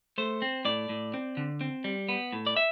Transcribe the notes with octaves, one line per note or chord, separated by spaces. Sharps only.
A3 C5
C4
A2 D5
A2
C4
D3
C4
G3
B3
A2
D5
E5